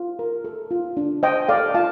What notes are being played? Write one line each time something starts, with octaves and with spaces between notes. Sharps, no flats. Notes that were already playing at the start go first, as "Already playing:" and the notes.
Already playing: F4
A#4
A4
F4
D4
C5 D#5 G5
A4 D5 F5
F4 F5 A5